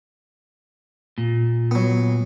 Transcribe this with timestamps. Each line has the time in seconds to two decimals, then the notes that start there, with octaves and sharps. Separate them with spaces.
1.18 A#2
1.71 F#3 B3